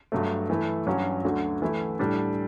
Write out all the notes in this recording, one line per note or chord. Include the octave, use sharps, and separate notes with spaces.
G2 F#3 A3
E3 A3 E4
G2 F#3 C#4 F#4
D2 D3 F#3 A3
E3 A3 E4
A2 G3 D4 A4